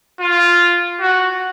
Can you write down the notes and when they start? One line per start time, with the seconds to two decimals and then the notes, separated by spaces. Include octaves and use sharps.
0.20 F4
1.00 F#4